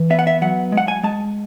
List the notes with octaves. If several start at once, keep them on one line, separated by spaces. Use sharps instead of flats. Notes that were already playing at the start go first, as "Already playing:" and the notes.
Already playing: E3
B3 E5
F#5
E5
F#3 F#5
G#3
F#5
G#5
G#3 A5